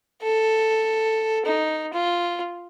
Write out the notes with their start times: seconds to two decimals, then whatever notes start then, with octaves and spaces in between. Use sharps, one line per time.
0.22 A4
1.45 D#4
1.93 F4